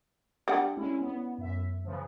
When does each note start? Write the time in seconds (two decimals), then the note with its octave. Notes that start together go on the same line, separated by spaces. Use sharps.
0.48 G3 D4 F#5
0.77 G#3 C#4 E4
1.01 B3
1.38 F#2 E5
1.84 C#3 E3 F3